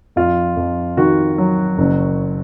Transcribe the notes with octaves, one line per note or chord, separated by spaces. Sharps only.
F2 F4
F2
D#3 F#4
F#3
F#1